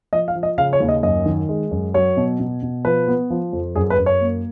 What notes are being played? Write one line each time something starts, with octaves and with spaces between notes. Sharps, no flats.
F3 D#5
F5
F3
D#5
C#3 F5
C#5
D#2
D#5
F#2 D#5
D#3
G#3
F#2
F#3 C#5
B2
B2
B2
F3 B4
B3
F3
F2
F#2 G#4
B4
F#2
C#5
A#3